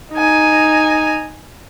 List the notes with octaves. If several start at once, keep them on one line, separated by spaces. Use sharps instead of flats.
D#4 G#5